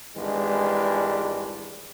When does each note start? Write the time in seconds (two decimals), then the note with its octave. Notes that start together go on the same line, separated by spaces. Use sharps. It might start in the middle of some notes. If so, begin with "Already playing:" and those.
0.16 G#1 E2 E3 G3 G#3 D4